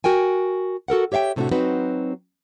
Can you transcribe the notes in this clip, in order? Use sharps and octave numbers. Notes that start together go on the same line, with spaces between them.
F#4 A#4 G5 G#5
F#4 A4 A#4 F#5
G4 C#5 E5 F5 G5
A2 C3 A3 C4 D4 F#4
F#3 C4 D#4 F#4 B4